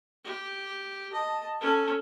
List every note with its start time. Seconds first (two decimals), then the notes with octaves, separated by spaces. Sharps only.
0.25 G4
1.13 D#5 A5
1.61 C#4 A4